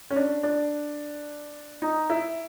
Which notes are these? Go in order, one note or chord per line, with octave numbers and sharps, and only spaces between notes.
C#4
D4
D4
D#4
E4